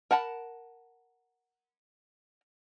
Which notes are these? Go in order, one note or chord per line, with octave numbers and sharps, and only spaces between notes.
A#4 F#5 A5 B5